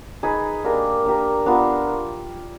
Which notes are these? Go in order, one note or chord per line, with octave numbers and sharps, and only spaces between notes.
D#4 G#4 B4
A#3 D4 G4 A#4
A#3 D4 G4 A#4
B3 D4 F4 A#4